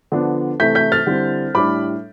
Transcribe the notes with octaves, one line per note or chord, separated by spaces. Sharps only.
D3 F3 B3 D4
C3 E3 A3 E4 G6 B6
G6 B6
F6 A6
D3 G3 C4 E4
A2 G3 D4 B5 D6